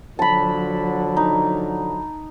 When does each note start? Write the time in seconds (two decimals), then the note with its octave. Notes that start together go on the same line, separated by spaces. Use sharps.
0.19 D3 F3 F#3 A5 B5
1.17 D#4